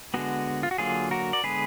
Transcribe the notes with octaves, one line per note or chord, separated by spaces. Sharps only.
D3 G#3 B3 F#4
F4
F#4
D3 F#3 A#3 F4 G#4
F#4 A#4
D5
D3 G#3 B3 G#4 B4